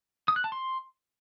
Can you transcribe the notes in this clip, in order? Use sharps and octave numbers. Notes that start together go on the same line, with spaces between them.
D#6
F#6
A5
C6